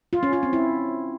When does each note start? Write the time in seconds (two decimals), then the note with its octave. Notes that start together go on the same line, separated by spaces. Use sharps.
0.13 F4
0.23 C#4
0.33 F4
0.43 C4
0.53 E4